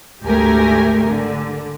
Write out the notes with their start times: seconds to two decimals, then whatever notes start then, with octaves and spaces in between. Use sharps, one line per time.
0.23 G#1 D2 A3 G4 A#4 G#5
1.07 D3